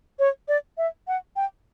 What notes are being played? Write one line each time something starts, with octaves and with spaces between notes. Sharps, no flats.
C#5
D5
E5
F#5
G5